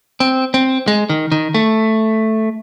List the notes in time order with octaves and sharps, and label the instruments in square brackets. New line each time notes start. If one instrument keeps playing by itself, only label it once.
[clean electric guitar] C4
C4
G#3
D#3
D#3
A3